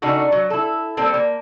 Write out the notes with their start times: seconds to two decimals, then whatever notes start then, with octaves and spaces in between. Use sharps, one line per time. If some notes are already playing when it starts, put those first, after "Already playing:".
0.02 C#3 A3 D4 D#4 F#4
0.32 F#3
0.50 E4 A4
0.97 G3 A#3 C4 A4
1.14 A#3